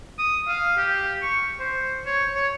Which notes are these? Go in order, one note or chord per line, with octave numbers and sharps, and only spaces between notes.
D#6
F5
G4
C#6
C5
C#5
C#5